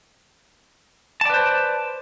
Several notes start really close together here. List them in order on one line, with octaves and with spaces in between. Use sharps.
A5 D5 B4 C5